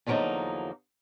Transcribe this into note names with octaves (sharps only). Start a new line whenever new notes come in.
E2 D3 F3 F#3 A#3 D#4